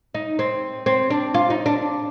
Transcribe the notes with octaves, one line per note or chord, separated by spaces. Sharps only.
D#4
C4
C4
D4
F4
D#4
D4